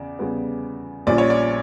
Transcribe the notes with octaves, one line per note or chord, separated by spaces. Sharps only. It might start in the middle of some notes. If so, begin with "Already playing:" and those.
Already playing: E2 C#3 D5
E2 C#3 G3 B3
A#1 A#2 G3 C#4 D5
C#5
D5